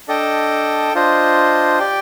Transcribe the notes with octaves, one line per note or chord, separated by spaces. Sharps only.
D4 A4 D#5 G5
D4 F4 C5 D#5
G4 D5 G5